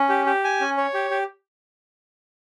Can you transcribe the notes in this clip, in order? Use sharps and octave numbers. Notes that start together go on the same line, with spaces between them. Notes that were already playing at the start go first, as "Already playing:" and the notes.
Already playing: C#4
G4
G4
G#5
C#4
C#5
G4
G4